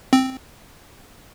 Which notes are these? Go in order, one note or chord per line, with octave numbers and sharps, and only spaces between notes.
C4